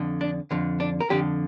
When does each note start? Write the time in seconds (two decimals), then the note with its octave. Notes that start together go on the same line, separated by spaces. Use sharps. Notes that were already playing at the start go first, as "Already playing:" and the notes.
Already playing: F2 D3
0.21 D4
0.51 F2 D3
0.80 D4
1.00 A#4
1.10 F2 D3 G4